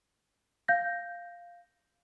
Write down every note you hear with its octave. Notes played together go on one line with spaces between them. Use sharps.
F5 G6 A#6